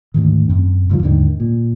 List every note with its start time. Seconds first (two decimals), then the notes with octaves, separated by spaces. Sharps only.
0.14 D2 G#2 D#3
0.48 F#2 C4
0.90 C#2 G2 D#3 F3
1.03 D#2 G#2 D3 D#3
1.40 A#2